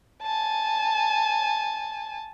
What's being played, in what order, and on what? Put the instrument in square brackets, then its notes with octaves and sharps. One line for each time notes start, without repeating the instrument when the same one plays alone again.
[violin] G#5 A5